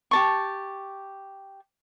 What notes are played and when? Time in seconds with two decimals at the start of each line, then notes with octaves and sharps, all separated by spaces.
0.11 G4 A5 C#6